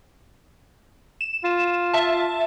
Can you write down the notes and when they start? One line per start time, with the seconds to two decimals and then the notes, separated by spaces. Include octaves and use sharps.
1.21 E7
1.44 F4
1.93 E5 A5